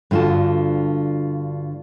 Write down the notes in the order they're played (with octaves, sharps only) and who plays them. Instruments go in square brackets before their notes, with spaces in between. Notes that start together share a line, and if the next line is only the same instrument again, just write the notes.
[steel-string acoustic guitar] G2 D3 F4 F#4 A5